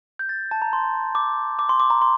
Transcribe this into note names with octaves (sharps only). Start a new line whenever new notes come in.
G6
A6
A5
A#5
C6
D6
D6
C6
D6
A#5
C6